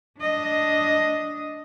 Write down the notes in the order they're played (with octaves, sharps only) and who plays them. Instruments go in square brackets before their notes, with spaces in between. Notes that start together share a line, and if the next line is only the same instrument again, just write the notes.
[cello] D4 D#5